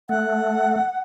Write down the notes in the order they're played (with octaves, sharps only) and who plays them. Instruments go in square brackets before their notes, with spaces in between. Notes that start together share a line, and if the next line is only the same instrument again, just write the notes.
[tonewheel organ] A3 [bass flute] F#5